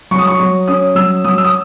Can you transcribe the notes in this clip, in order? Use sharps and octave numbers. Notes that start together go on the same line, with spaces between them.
F#3 C#6
D#6
C#6
F#3 C#6
C#4 D#6
F#3 E6
F#3 D#6
E6
D#6